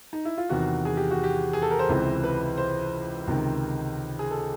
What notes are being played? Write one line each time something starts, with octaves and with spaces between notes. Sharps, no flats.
D#4
E4
F4
E2 C3 D#3 F#4
G#4
G4
F#4
G4
G#4
A4
A#4
C5
C#2 C3 E3
B4
C5
C#2 C3 D#3
G#4
A4